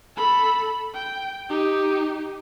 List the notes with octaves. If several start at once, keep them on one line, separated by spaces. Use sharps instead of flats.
A4 B5
G5
D#4 G4